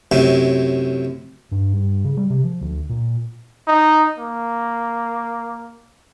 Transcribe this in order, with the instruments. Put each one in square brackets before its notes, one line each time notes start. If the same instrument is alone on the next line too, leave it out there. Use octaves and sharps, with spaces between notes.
[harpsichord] F#2 A2 C3
[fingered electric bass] G2
G2
C#3
G3
C3
F3
D2
A#2
[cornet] D#4
A#3